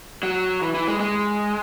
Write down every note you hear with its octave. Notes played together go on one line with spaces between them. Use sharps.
F#3
E3
E3
G#3
G#3